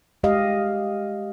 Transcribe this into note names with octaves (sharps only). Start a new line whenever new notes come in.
G#3 G4 D#5 F5